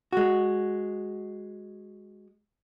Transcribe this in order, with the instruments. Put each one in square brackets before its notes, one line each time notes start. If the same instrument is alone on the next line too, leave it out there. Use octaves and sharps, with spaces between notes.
[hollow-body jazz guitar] G#3 F#4